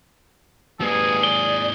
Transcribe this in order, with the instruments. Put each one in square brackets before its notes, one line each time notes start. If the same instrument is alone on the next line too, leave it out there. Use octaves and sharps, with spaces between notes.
[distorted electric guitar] G#2 A#3 [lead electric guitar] G4 B4 [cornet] G#4
[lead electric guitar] D5 [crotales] G7